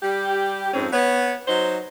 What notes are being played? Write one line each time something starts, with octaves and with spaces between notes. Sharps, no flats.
G3 G4
F2 G#2 C4 C#4
B3 C#5
F#3 D#4 C5